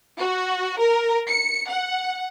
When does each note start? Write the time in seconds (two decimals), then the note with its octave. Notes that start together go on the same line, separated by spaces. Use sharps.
0.19 F#4
0.80 A#4
1.29 C#7
1.69 F#5